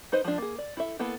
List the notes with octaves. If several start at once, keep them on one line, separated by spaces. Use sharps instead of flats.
D#4 B4 C5 D#5
F3 G#3 D4
A#3 G#4
D5
E4 A4 E5
A#3 B3 E4 A4